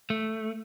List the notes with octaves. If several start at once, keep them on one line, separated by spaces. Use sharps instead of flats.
A3